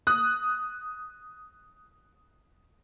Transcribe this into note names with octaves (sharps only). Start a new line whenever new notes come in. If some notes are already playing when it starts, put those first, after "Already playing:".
D#6 F#6